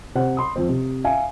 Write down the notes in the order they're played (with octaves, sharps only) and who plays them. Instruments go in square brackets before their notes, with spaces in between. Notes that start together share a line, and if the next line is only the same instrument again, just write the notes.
[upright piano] C3 C5 F#5
B5 C6 D#6
F2 C4
C3
E5 F5 G#5